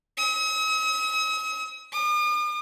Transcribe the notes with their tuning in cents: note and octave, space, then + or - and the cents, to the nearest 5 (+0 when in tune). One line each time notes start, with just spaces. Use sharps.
D#6 +45
D#6 -45